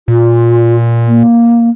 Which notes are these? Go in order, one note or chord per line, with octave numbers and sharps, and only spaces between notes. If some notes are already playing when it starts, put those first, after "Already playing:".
A#2 F4
A#3